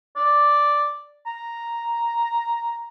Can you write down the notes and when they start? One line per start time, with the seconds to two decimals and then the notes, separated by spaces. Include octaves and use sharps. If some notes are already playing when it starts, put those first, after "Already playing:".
0.16 D5
1.26 A#5